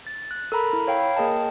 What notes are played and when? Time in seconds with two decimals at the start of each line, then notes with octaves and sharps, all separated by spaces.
0.07 A6
0.31 F#6
0.52 A4 A#4 A#5 B5
0.73 E4
0.87 C#5 F5 G5 B5
1.16 A#3 G#4 A#4 D#5 G5 A5